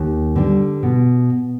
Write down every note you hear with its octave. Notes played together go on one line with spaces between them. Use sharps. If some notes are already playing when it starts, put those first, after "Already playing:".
Already playing: D#2
D3 G3
B2